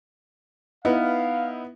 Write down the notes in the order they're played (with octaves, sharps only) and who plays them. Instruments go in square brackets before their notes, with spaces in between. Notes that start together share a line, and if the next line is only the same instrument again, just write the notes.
[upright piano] B3 [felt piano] D#4 E4 B4 [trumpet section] F5